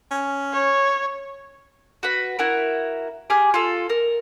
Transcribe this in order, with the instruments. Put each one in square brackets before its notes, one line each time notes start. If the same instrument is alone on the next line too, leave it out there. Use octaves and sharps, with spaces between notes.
[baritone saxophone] C#4
[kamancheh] C#5
[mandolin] F#4 B4 B5
E4 F#4 A#4
G4 G#4 D6 F6
F4 A4
A#4